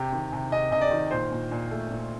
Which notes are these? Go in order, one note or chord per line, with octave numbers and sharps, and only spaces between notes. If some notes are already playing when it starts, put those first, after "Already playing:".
Already playing: C3 G4
D#3
C3
C3 D#5
C3 D#5
D5
D#3
A#2 C5
A#2
A#2
A3
A#2